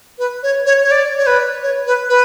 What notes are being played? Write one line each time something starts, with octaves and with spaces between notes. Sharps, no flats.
B4
C#5
C#5
C#5
D5
C#5
B4
C#5
B4
B4